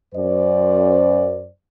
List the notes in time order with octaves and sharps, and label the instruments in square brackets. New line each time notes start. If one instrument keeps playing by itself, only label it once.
[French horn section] F#2 C5 D5